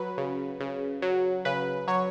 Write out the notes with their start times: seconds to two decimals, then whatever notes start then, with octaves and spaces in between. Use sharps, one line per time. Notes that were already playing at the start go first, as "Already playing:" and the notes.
Already playing: F#3 B4
0.18 C#3
0.60 C#3
1.02 F#3
1.45 C#3 B4
1.88 F#3 C#5